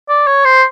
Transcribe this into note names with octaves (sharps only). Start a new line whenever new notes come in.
D5
C#5
C5